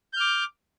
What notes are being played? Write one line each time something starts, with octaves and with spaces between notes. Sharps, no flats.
D6 F6 G6